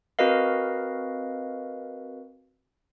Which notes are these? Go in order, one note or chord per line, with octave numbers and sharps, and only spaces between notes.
C4 F#4 A#4 B4 D#5 F5